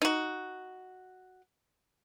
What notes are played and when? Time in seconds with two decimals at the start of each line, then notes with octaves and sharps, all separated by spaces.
0.02 D#4 F#4